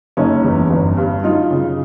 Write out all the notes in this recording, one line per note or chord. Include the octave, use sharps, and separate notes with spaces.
F#1 C#4 D#4
E2
G1
G2
F#2 D#4 F4
C#3